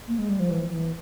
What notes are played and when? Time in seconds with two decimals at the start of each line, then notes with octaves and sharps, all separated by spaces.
0.08 A#3
0.18 G#3
0.29 G3
0.40 F3
0.50 E3
0.70 E3